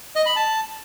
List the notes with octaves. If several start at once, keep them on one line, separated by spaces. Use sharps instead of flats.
D#5
B5
A5